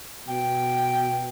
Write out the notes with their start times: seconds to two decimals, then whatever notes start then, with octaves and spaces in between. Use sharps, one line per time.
0.29 B2 G5